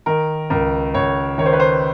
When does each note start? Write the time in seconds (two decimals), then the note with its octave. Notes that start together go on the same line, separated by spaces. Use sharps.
0.06 D#3 A#4
0.50 C#2 A#4
0.94 C#2 C#5
1.38 D#3 C#5
1.46 C5
1.53 B4
1.60 C5